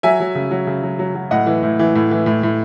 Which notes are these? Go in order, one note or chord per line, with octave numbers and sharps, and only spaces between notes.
F#3 E5 G#5
F#3
C#3
F#3
C#3
F#3
F#3
F#3
A2 D#5 F#5
E3
A2
E3
A2
E3
A2
A2